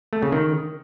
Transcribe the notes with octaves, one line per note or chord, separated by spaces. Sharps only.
A3
C#3
D#3